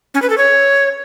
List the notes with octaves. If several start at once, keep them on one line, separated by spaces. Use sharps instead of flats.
C#4
B4
A4
C#5